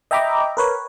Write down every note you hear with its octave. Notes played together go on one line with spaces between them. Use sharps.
D#5 E5 G5 A#5 B5 D6
A#4 B4 C#5